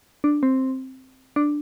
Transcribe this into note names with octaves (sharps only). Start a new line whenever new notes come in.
D4
C4
D4